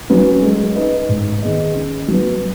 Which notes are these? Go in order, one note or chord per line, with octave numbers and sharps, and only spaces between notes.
F#3 C#4 B4
G#3
D#4 B4 D#5
G#2
D#3 B3 G#4 D#5
C#3
F#3 B3